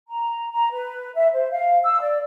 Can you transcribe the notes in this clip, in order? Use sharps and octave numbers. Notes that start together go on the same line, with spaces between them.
A#5
A#5
B4
E5
C5
F5
E6
D5